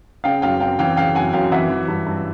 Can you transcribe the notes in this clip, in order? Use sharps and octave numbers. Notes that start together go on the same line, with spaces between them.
C#3 F5 G5
F#2 F5 G5
F#2 F5 G5
E3 F5 G5
C#3 F5 G5
F#2 F#5 G#5
F#2 F5 G5
E3 E5 F#5
E3
G2
G2